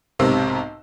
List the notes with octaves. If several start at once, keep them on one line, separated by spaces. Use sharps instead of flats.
B1 G#2 C3 C4 A#4 E6